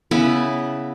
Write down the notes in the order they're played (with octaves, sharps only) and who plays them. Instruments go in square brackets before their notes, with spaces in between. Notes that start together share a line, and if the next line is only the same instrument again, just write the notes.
[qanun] C#3 B3 E4 B4